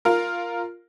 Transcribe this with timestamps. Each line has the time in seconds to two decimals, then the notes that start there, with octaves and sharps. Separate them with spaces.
0.05 F4 A#4